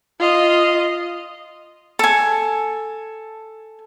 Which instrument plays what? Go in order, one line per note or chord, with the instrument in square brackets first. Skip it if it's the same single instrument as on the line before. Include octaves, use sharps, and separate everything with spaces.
[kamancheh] F4 D#5
[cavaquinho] A4 G#5